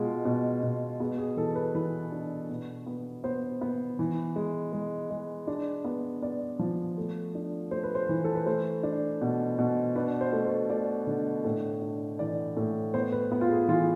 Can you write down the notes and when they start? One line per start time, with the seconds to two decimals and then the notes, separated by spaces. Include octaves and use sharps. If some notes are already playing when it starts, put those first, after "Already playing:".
Already playing: B2 G#3 F4
0.25 B2
0.63 B2
1.00 B3 G#4
1.18 G#4
1.37 E3 A4
1.55 B4
1.75 E3 B4
2.12 D4
2.49 B2
2.86 B3
3.24 B3 C5
3.61 B3
3.99 E3
4.36 G#3
4.73 G#3
5.10 G#3
5.47 D4
5.84 B3
6.22 B3 D5
6.59 F3
6.97 A3
7.35 D4
7.71 A3 C5
7.83 B4
7.95 C5
8.09 E3
8.24 A4
8.35 B4
8.46 A3 C5
8.83 D4
9.21 B2
9.59 B2
9.96 D4 B4
10.21 C5
10.32 A3
10.46 C5
10.70 A3 D5
11.07 D3
11.45 A2
11.82 D4
12.19 E3 D5
12.57 A2
12.94 B3 C5
13.12 B4
13.32 B3
13.41 F4
13.49 G#4
13.68 E3 F4